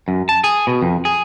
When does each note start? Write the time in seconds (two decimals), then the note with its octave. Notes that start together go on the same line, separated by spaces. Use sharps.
0.08 F#2
0.29 A5
0.44 G#4
0.67 B2
0.82 F2
1.05 G#4